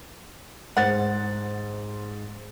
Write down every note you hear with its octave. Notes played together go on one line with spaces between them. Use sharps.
G#2 C5 F#5 A6